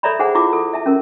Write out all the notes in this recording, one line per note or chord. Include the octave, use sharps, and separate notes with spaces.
A4 C#5 D5 E5 A#5 B5
G#4 C5 F#5 G#5
E4 F4 D6
A4
E5 A5
C#4 A#4